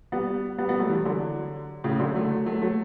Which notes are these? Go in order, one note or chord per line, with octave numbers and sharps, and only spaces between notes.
G3 B3
G3 B3
G3 B3
F#3 A3
E3 G3
D3 F#3
A2 C#3
D3 F#3
F#3 A3
F#3 A3
F#3 A3